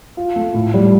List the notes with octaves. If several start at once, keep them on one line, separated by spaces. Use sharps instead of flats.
F4
A3
A2
G3